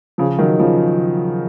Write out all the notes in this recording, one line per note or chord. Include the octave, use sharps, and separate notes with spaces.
C#3 F3
D#3 F#3
C#3 F3